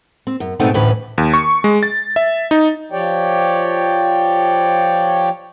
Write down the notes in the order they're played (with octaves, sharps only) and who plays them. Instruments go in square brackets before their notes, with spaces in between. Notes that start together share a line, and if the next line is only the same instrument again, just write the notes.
[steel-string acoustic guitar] C4
F#2
G#2 B2 A3 B3 C4 D#4
D2 A2 E3 C#4 B4
[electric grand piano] D#2
C#6
G#3
A6
E5
D#4
[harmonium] F3 G4 C#5 D5 G5